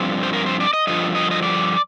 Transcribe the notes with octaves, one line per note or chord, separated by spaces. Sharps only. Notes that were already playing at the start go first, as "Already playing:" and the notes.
Already playing: G2 F3 C4
C5
A#4
C5
D5
D#5
G2 D3 F3 D#5
D#5
D#5
D5